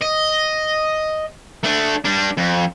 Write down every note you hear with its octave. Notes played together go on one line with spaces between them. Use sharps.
D#5
A3 D4
G3 D4
F2